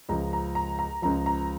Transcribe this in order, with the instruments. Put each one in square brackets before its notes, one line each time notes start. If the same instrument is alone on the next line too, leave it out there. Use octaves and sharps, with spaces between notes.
[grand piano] C#2 C#3 F3 A#5
A#5
A#5
A#5
C#2 C#3 F3 A#5
A#5